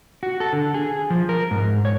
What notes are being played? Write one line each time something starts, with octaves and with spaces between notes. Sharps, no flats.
F#4
A4
D3
G#4
F3
A#4
G#2
C#5